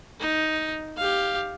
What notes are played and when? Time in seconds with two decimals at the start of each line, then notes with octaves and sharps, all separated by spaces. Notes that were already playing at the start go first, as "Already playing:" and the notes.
0.20 D#4
0.97 G4 F5